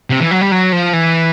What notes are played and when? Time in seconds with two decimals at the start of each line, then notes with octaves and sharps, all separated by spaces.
0.10 C3
0.20 E3
0.31 F#3
0.41 G3
0.52 F#3
0.72 F3
0.93 E3